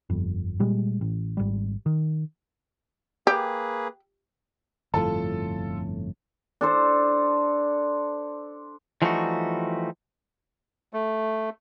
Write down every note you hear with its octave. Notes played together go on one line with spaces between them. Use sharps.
G1 F2
A#2 G3 G#3
A1
G#1 G3
D#3
A#3 G4 G#4 B4
G1 F2 A2 F4 A4 A5
D4 A4 C5
E3 F3 G3 A3 D#4 F#4
A3